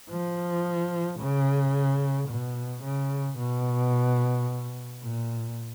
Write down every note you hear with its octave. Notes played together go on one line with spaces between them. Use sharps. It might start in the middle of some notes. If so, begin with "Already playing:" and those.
F3
C#3
B2
C#3
B2
A#2